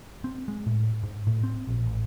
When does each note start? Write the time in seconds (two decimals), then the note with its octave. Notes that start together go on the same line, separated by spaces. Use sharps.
0.24 C4
0.48 G#3
0.66 A2
1.03 G#2
1.27 A2
1.43 C4
1.67 A#1
1.86 A1